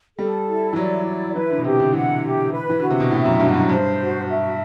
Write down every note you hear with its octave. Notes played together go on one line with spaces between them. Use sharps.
G3 A4
E4
E3
F#3 D5
E4
E3 B4
D3
B2
C3 G4
D3
E3 F#5
G4
B4
E3
D3 F#4
C3
B2
A2 E5
F#2
G2 F#4
F#2
G2 C5
F#4
E5